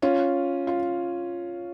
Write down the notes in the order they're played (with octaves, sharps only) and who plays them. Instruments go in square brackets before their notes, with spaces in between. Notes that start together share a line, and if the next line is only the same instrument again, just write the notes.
[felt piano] C#4 F4
F4